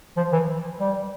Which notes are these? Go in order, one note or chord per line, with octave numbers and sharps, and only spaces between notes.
F3
E3
G3